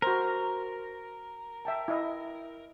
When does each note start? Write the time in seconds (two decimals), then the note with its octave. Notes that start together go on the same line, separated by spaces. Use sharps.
0.02 F#4 A#4 C5
1.65 E5 G5 A5
1.88 E4 D#5